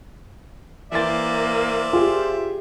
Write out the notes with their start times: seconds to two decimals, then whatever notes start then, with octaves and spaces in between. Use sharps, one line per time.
0.92 E3 A#3 C5 D5 E5 A6
1.93 F4 G4 G#4